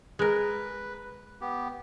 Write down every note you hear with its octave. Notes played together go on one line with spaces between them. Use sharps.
G#3 A#4 B4
B3 G4